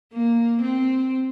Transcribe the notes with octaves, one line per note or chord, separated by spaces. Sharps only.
A#3
C4